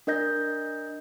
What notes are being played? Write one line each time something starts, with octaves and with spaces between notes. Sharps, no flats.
D4 A#4 D#5 G6 A#6